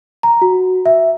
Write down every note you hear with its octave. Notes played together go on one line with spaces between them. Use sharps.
A#5
F#4
E5